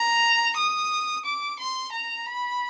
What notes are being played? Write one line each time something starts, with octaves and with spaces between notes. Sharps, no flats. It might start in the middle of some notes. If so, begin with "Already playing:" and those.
Already playing: A#5
D#6
D6
C6
A#5
B5